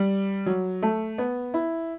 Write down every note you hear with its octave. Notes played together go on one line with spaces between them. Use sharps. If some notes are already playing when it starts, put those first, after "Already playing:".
Already playing: G3
F#3
A3
B3
E4